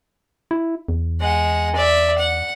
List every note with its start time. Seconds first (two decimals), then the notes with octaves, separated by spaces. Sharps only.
0.51 E4
0.88 E2
1.21 G#3 F#5
1.75 D5 E5
2.18 F#5